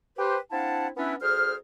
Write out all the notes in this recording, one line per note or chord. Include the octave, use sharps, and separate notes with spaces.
G4 B4 C5
C4 D4 E4 F5 F#5 A5
B3 C#4 D4 E4 B4
D2 G#4 C5 F6